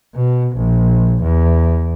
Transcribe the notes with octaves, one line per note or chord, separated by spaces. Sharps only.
B2
A#1
E2